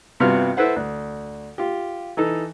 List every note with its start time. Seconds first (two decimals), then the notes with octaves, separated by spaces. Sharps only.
0.20 G2 C3 B3 F4 F#4 F6
0.57 E4 A4 B4 C5 F#5
0.76 D2
1.58 F4 G4
2.17 E3 D#4 A4